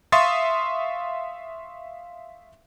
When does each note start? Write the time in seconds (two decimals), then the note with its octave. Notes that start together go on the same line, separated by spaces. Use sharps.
0.12 E5 F5 C6 C#6 D#6 A6